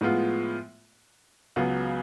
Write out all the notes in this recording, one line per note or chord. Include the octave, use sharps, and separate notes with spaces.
A2 F3 G#3 B3 F4
C#2 C#3 F#3 B3